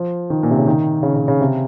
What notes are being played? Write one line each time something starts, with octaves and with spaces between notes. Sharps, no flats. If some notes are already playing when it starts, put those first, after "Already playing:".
Already playing: F3
D#3
A#2
C3
C#3
D#3
C#3
C#3
C#3
C3